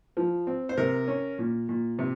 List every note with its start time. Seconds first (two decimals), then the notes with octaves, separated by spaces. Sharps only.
0.17 F3
0.47 C4
0.69 C5
0.77 C3 A#4
1.07 C#4
1.38 A#2
1.69 A#2
1.99 C3